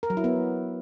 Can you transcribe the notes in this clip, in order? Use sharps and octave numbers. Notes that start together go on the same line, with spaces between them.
A#4
F#3
E4
B3